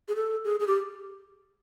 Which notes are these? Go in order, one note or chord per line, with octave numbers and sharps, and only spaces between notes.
G#4
A4
G#4
G#4
G4